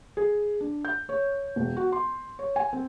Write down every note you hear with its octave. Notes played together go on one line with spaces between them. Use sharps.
G#4
D4
G6
C#5
E1
F#4
C6
C#5
G#5
C4